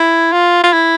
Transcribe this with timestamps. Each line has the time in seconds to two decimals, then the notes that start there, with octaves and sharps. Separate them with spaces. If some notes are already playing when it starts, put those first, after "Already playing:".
Already playing: E4
0.32 F4
0.63 F4
0.73 E4